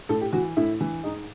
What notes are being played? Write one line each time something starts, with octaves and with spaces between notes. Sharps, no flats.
A2 A4
G4
E3 F#4
A2 E4
E3
G#2 D#4